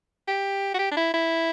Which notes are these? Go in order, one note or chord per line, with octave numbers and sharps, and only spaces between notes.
G4
F#4
G4
D4
E4
E4